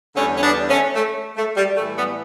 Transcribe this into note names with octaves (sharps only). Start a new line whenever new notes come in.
E2 D3 G3 A3 C#4
C#4
B3 D4
A3 C#4
A3
A3
G3
A2 E3 G3 A3
G3 B3